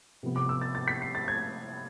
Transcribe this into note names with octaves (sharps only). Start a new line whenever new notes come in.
C3 F3 B3
D6
E6
A6
A6
B6
C7
A6
G#6